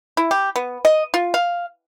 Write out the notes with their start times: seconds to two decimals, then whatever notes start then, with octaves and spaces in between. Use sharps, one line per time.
0.17 E4
0.31 G4
0.56 B3
0.85 D#5
1.14 F4
1.34 F5